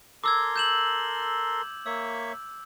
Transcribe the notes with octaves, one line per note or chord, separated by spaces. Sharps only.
A4 A#4 C6 D6 E6 G#6
G6 E7 F#7
A#3 C#5 E5 E6